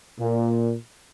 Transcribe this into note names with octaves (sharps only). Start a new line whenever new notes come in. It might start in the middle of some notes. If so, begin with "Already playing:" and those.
A#2